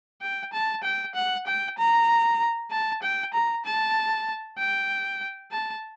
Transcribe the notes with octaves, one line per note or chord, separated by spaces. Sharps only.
G5
A5
G5
F#5
G5
A#5
A5
G5
A#5
A5
G5
A5